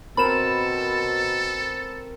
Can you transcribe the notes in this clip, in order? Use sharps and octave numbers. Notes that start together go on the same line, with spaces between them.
B2 C4 A4 A#4 C5 B5 E7